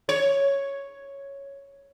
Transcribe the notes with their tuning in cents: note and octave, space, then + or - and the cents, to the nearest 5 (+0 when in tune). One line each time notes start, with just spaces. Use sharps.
C#5 +0